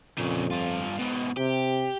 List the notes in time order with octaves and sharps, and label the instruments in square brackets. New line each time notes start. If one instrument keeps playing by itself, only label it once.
[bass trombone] F2 [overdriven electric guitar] A#2 C#3
[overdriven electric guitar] G2 F4
G#2 B2
[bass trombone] C3 [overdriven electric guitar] G4